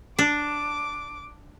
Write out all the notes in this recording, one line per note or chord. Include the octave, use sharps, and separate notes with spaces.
D4 D6